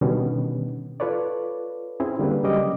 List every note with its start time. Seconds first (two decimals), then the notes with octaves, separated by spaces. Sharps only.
0.01 B2 D3 D#3 G3 B3 C#4
1.00 F4 A4 B4 C#5 D5
2.00 C4 C#4 E4 G#4
2.19 D3 G3 A#3 B4
2.43 C#3 F#3 G3 C#4 D#5 D6